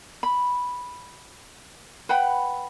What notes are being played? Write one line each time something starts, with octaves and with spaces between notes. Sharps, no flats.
B5
B4 F#5 G5 B5